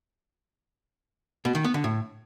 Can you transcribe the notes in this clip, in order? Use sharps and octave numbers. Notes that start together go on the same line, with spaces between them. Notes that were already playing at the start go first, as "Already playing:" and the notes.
B2
D#3
B3
D3
A2